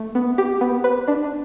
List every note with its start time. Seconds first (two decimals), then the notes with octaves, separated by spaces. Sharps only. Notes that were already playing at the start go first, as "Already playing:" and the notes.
Already playing: A3
0.15 B3
0.38 G4
0.61 B3
0.84 B4
1.08 D4